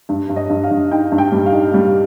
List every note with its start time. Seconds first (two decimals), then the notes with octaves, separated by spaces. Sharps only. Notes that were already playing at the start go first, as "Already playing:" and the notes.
0.09 G2
0.29 G2
0.36 D#5
0.50 G2
0.64 F5
0.71 G2
0.91 D#4 G5
1.12 G2
1.18 G5
1.32 G3
1.46 F5
1.52 D#4
1.74 G3